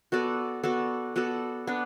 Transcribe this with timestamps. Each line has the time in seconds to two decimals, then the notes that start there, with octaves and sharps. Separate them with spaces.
0.12 B3 F#4 A4 D5
0.64 B3 F#4 A4 D5
1.16 B3 F#4 A4 D5
1.67 B3 D4